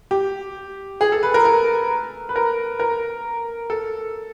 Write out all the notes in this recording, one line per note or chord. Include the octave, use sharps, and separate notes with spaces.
G4
G#4
A4
B4
A#4
A#4
B4
A#4
A#4
A4